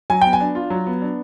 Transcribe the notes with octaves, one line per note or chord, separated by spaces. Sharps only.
F#3 G#5
B3 G5
G#5
D4
F4
F#3
B3
D4